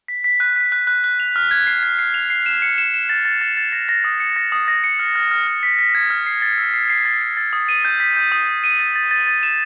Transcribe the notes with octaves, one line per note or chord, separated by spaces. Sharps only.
B6
B6
F#6
B6
F#6
F#6
F#6
F7
F6
G#6
C7
G#6
C7
F7
C7
E7
C#7
E7
E7
A6
A6
A6
A6
A#6
A#6
D#6
C#7
A#6
D#6
A#6
C#7
F6
F6
F6
F6
B6
B6
G#6
F6
C7
A6
E6
C7
C7
A6
C7
A6
D#6
D#7
G6
B6
G6
D#6
G6
D#7
A6
A6
A6
A6
E7